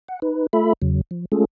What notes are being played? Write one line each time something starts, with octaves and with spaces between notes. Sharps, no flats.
F#5
D#4 B4
A3 F4 A4 E5 B5
E2 C#3 F#3
F3
G#3 A3 C#4 F4 G#4 A4